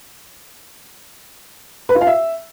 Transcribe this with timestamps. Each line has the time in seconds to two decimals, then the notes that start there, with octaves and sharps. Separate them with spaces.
1.89 B4
1.95 F4
2.01 F5
2.07 E5